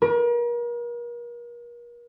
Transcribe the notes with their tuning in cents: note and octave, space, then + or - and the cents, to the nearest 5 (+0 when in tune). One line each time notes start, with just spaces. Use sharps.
A#4 +40